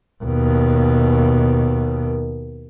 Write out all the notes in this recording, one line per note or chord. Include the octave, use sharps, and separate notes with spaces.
D#2 B2